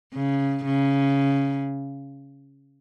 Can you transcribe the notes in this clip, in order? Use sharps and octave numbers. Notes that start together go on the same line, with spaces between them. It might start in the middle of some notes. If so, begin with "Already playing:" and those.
C#3
C#3